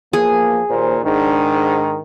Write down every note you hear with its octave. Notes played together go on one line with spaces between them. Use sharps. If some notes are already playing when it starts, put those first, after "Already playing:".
E2 F3 A#3 G#4
D#2 A#2 C5
G#2 D#3 D4